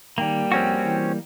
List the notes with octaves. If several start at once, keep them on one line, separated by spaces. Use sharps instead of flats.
D#3 G3 A#3 G5
F2 C4 C#4 F#4
E3